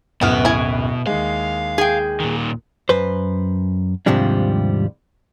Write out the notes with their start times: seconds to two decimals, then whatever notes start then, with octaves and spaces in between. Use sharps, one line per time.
0.21 D1 F#2 B2 B3 E4 F6
0.45 E4 G#5
1.07 D#2 G#3 F5
1.78 G#4 G5
2.20 A#2 D#3
2.89 F#2 B4 C5
4.06 D#2 G#2 C3 F3 G3 D4